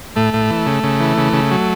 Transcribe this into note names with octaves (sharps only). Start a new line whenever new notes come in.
A2 A3
A2
E3
C#3
C#3
E3
C#3
C#3
F#3